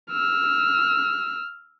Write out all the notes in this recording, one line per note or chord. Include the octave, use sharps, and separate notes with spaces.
E6 F6